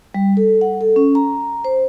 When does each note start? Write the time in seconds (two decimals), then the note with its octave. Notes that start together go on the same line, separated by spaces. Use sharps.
0.14 G3
0.37 A4
0.61 F#5
0.81 A4
0.96 C#4
1.15 A#5
1.64 C5